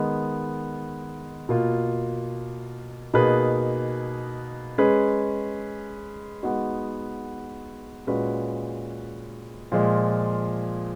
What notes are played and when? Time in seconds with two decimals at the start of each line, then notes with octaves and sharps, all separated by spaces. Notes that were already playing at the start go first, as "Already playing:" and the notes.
Already playing: D#3 G#3 B3
1.49 B2 A#3 F4
3.14 B2 A#3 D#4 G#4 B4
4.78 G#3 C#4 G#4 B4
6.43 G#3 B3 D#4 F#4
8.07 A#2 G#3 C#4 F#4 B4
9.72 A#2 F3 G#3